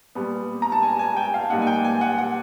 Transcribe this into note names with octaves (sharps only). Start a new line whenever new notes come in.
A#2 G3 B3
A#5
A5
G#5
G#5
G5
F5
A#2 G3 A#3 D#4 F#5
G#5
G5
G#5
F#5
F#5